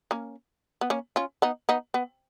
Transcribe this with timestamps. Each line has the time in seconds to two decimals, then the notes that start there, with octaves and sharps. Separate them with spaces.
0.11 A#3 C#4
0.81 B3
0.90 A#3 C#4
1.16 C#4 F4
1.42 B3 D#4
1.69 B3 D#4
1.94 B3